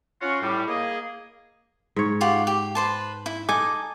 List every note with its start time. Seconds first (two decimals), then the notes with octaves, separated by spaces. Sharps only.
0.22 C#4 F4 F#4
0.42 A2 G3
0.68 A#3 G#4 D#5
1.96 G#2 C#5
2.21 F4 G4 F#5
2.47 G4
2.75 B4 C5 A5
3.26 E4
3.48 D#4 A4 D#5 G#5 D6